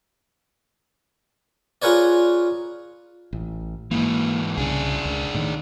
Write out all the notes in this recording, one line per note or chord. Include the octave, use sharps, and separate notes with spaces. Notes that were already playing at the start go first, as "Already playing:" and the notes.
F4 G#4 A#4 B4 C#5 D5
A1
G#2 E3 A#3
C2 C#3 D4 G#4
C#2
A2 D#3